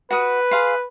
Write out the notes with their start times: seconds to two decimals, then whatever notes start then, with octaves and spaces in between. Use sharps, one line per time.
0.11 F#4 B4 D#6
0.51 G#4 F5 C6